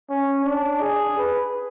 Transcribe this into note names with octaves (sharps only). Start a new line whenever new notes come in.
C#4
D4
G#4
B4